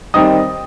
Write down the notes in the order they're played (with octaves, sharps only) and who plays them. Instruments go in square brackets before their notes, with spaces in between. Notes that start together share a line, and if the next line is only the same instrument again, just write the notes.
[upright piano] D#3 G3 C4 D#4 D#6